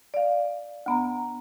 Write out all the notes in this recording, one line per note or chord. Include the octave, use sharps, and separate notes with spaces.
D5 F5
D2 B3 A#5